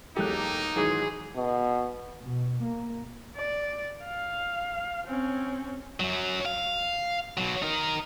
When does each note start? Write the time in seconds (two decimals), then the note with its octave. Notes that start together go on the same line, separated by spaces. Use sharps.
0.17 E1 B1 A#3 D#4 G4 A4 F#6
0.76 G#2 D#3 E3 F#3 G#4
1.36 B2
2.22 B2
2.63 A#3
3.37 D5
4.05 F5
5.06 C4 C#4
6.00 F#2 F#3
6.46 F5
7.37 B2 F#3
7.62 D#4 A#4